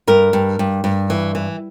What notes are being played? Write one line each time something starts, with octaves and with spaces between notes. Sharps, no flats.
G2 A#4
G2
G2
G2
E3
E3